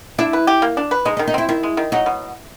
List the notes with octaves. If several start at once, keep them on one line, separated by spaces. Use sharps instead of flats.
D4 E4
B4
G4
A#3
D4
B4
G#3 D#4
D#4
D#3
D#4
C4 E4
D#3 E4
G#3
D#3
F#3 D#4
B2